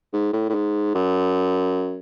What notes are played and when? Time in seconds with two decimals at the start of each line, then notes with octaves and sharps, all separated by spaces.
0.13 G#2
0.33 A2
0.49 A2
0.54 G#2
0.94 F#2